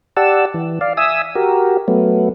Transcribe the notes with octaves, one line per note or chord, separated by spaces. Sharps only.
G4 D5 F#5 A5 E6
E3
D5 F5
E5 G#5 D#6 E6
F#4 G4 A#4
F#3 A3 B3